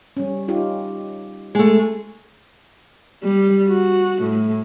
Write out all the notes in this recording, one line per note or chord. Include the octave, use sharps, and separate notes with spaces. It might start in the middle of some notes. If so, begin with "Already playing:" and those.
G3 C#4
D#4 F4 G4
G#3 A3
G3
F#4
A2